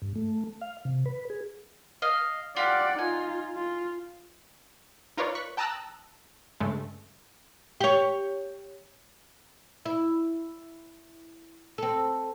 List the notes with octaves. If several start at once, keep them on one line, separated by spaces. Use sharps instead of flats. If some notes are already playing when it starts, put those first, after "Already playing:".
G2
A3
F5
C3
B4
G#4
D#5 F5
F4 G4 D5 F5 F#5
D#4 F4 G#5
F4
D#4 F4 A#4 B4 C#5 D5
C#6 F#6 B6
G5 A5 A#5 D#6 E6 F#6
G2 C#3 G#3 A3
G4 C#5
E4
C4 A4